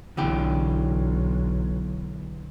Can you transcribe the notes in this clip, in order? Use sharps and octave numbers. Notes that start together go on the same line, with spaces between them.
B1 D3 E3 G4